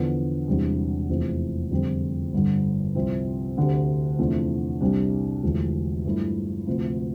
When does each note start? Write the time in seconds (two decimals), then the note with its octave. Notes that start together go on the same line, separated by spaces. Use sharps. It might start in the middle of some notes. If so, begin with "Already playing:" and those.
Already playing: E2 D3 F3 B3 D4
0.47 E1 E2 C3 G3 D4
1.09 F1 E2 C3 F3
1.71 F2 D3 G3 C4
2.33 G1 G2 D3
2.95 C2 C3 F3 C4
3.57 D2 D3 A3 C4 G4
4.18 E2 C3 F3 A3 D4
4.81 C2 C3 G3 D4 G4
5.43 E1 E2 D3 F3 A3
6.05 G2 F3 A3 E4
6.67 D2 C3 F3 A3